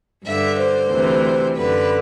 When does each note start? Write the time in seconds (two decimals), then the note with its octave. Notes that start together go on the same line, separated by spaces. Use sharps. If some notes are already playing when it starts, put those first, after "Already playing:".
0.24 G2 D3 E5
0.58 C5
0.90 D2 C3 E3
1.56 F#2 D3 B4